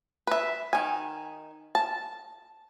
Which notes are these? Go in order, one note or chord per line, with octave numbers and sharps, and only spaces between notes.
B4 E5
D#3 G#5
A5